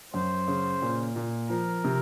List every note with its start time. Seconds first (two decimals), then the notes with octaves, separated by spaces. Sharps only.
0.14 F#2 C5
0.48 C#3
0.82 A#2
1.16 A#2
1.50 F3 A#4
1.84 C3